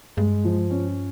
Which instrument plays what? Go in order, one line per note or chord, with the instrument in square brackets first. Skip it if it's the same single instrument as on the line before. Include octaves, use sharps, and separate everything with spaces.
[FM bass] G2 [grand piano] G#3
[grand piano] F3
C#4